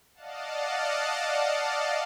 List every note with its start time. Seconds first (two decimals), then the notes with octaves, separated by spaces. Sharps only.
0.14 D5 D#5 F5 F#5 A5